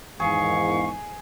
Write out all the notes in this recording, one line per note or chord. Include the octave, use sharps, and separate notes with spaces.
E2 G#2 D#3 G#4 F5 C#6